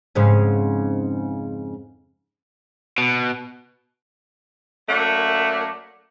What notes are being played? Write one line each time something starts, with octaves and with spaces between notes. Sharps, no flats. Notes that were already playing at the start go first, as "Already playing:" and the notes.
F2 G#2 C#3
B2
F#2 A3 A#3 D5 E5 F#5